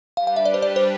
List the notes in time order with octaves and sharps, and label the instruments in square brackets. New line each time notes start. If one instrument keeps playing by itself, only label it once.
[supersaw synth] G3 D4 G4 B4 [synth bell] F5
[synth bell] F5
E5
D5
C5
D5
C5